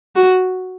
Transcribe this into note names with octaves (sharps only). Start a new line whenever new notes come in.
F#4